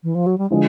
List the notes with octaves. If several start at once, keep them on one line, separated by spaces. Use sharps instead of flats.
E3
F3
F#3
G3
D3 F3 G#3